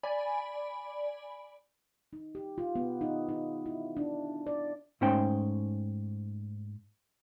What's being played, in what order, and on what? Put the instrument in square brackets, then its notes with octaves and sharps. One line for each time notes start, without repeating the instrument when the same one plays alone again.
[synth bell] D5 G#5 B5
[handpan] D#4
G4
F4
B3
D#4
D#4
E4
D4
D5
[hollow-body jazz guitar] G#2 A3 C#4 D#4 C5 G5